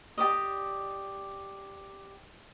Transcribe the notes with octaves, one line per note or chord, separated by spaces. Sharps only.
G4 D5 D#5